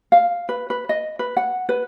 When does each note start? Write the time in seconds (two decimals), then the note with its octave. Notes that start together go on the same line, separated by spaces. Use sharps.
0.12 F5
0.49 B4
0.70 B4
0.89 D#5
1.19 B4
1.37 F#5
1.69 B4